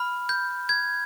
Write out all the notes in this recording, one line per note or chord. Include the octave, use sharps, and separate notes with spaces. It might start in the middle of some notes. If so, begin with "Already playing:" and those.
Already playing: B5 F6
G6
G#6